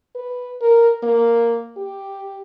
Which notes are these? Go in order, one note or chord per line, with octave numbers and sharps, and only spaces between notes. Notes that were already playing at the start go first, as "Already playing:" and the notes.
B4
A#4
A#3
G4